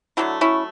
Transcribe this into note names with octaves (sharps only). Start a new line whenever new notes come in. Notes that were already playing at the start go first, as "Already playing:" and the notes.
D3 F#3 A3 E4 G4
C#4 E4